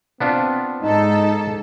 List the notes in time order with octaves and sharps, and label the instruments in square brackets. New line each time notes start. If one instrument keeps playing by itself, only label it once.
[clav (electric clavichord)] B3 D4 F4 [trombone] C4
[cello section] G#2 A4 [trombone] D#4